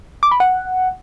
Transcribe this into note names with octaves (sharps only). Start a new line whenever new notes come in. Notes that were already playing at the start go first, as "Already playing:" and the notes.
D6
B5
F#5